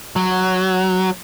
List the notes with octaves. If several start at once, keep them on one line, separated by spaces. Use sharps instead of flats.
F#3